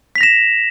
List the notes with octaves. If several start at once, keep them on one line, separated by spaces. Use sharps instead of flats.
A#6 B6 E7 F7